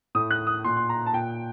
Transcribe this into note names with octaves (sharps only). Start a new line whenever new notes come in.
A2 D#6
F#6
D#6
A#2 C6
C6
A#5
A5
A#2 G5